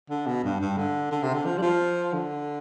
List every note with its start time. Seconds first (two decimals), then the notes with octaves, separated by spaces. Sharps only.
0.10 D3
0.27 B2
0.44 G2
0.61 G2
0.77 D3
1.12 D3
1.23 C3
1.34 D3
1.45 F3
1.58 G3
1.62 F3
2.13 D3